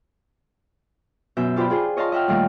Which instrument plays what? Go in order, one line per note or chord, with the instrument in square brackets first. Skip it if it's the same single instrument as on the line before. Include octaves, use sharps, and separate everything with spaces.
[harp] F#2 B2 E5 G6
F4 G4 C5 D5 B5
F4 G#4 C5
C#5 D#5 F5 A5 C6
D#5 E5 F#5 G5 F6
A#2 D#3 G3 A3 D#5 F5